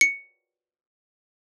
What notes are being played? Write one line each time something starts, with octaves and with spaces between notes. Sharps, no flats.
C#7